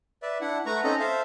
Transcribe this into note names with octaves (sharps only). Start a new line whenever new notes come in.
B4 D5 E5
D4 E4 F#5
A3 B4 F#5 A#5 C#6
C4 C#4 D#4 A4 D#5 A#5
A4 C5 E5 F5